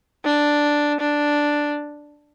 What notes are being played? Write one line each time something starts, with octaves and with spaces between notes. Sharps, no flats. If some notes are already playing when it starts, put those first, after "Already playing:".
D4
D4